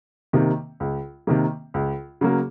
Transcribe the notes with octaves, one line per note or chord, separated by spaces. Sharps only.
C3 D#3 A#3
C#2
C3 D#3 A#3
C#2
C#3 F#3 A#3